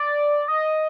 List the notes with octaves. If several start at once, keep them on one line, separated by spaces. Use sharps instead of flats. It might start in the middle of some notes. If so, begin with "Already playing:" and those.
Already playing: D5
D#5